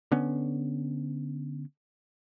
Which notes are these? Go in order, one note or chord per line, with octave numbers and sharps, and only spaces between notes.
D3 B3 C#4